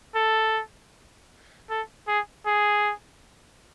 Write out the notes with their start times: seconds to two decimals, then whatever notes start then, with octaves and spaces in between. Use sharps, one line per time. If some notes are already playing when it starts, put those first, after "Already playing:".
0.15 A4
1.70 A4
2.07 G#4
2.46 G#4